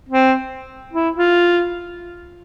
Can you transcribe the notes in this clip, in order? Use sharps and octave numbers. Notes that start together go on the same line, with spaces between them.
C4
E4
F4